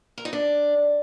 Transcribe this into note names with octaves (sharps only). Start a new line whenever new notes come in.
A#4
D#4
D4